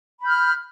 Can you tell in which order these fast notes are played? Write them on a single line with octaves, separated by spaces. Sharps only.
B5 G6 F6